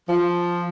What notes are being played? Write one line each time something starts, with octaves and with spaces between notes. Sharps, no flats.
F3